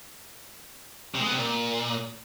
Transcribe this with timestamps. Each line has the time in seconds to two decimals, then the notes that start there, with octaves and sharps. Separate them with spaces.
1.15 C3
1.20 G#3
1.26 B3
1.32 C3
1.37 A#2